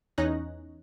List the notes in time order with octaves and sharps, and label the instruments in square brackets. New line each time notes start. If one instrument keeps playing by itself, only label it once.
[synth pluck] E2 C#4 D#4 C#5 F#6 A#6